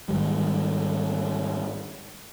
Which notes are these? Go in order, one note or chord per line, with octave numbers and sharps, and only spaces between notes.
G#2 D#3 G3